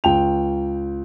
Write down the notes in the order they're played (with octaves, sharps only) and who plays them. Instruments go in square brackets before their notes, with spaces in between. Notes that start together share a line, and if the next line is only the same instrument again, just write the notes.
[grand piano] C#2 G5 F7